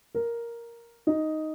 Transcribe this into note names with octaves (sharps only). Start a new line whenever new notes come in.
A#4
D#4